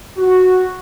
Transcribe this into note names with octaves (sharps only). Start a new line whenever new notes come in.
F#4